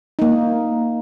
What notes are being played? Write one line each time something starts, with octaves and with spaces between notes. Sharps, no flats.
A#3 D#4